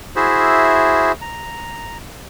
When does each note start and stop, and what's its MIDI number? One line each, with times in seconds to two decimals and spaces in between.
0.16 1.12 64
0.16 1.12 66
0.16 1.12 68
0.16 1.12 72
0.16 1.12 76
1.21 1.97 82